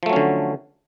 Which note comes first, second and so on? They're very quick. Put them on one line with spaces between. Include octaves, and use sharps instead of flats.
F3 A3 F#3 C#4 D3